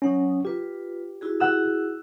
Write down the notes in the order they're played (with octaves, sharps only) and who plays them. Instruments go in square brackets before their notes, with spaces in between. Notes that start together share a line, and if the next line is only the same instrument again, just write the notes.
[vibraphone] F#3 F#5 D#6 [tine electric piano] C#4
[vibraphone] F4 B4 [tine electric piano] G4
[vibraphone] E4 F#4 G#4
[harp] F#5 E6